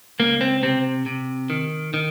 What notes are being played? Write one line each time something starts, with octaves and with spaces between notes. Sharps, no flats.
C#2 A#3
C4
C3 C4
C3
D#3
D#3